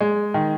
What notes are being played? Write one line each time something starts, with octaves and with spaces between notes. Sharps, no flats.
G#3
D#3